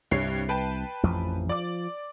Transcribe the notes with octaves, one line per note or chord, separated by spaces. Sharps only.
C2 G2 C3 C#5 C7
B4 G5 A5
A1 F2 F3
F3 D5 D6